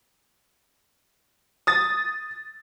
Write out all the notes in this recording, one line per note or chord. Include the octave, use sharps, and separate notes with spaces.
D#6 A6